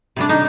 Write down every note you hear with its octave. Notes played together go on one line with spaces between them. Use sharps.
C3 G3 D4
D#4